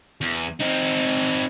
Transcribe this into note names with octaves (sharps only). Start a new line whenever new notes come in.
E2
C4 D#4